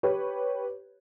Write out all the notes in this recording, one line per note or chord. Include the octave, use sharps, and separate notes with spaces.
G4 B4 C#5